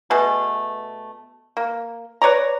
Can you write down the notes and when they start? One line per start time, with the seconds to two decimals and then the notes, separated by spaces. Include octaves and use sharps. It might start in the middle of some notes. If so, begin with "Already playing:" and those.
0.10 B2 A3 G#4
1.57 A#3
2.22 B4 C#5 D5 A#5